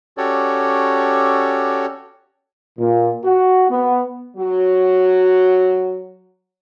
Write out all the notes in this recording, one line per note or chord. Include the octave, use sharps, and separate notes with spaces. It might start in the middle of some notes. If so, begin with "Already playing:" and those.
C#4 F#4 G4 A4 C#5 D5
A#2
F#4
B3
F#3 F#4